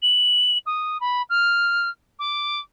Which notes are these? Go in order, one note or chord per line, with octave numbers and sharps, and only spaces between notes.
F#7
D#6
B5
F6
D6